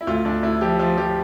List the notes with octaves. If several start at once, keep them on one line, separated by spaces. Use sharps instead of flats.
E4
D2 F4
D2 D4
D2 E4
F3 G4
F3 F4
F3 G4